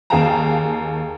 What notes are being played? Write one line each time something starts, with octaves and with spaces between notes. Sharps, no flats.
D#2 G#4 F5 G5 A5 A#5